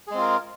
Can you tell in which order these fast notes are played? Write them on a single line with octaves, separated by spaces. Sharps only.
G#4 G#3 C4 F4 A#4